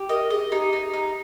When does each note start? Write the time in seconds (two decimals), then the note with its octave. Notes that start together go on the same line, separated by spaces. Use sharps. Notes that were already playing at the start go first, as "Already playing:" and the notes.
Already playing: G4
0.09 A#4 D#5
0.30 G#4 D#5
0.52 D#4 G4
0.73 D#4
0.94 D#4